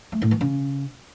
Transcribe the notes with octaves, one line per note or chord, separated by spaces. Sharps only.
A3
A2
E3
C#3